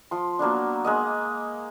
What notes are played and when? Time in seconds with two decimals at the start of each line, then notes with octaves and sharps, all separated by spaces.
0.11 F3 C6
0.39 F#3 A#3 B3 D4
0.84 G#3 A#3 D#5